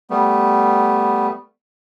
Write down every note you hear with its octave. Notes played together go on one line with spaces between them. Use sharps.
G3 A3 B3